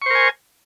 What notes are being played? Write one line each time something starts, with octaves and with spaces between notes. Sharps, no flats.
A#4 C5 G#5 C#6